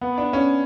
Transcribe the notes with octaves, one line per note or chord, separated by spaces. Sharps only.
B3
D4
C#4